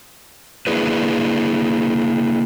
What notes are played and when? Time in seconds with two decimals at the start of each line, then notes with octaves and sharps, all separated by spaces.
0.67 A#3 D4 E4 G#4 B4